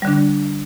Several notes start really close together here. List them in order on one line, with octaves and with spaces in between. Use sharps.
G3 D3 D4